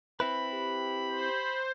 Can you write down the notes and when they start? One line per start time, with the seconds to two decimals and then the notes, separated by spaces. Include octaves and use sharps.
0.20 C4 E4 B4 B5
0.53 G4
1.10 C5